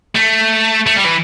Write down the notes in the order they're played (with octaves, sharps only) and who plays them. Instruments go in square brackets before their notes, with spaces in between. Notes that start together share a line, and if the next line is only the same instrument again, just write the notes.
[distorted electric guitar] A3
A3
G3
E3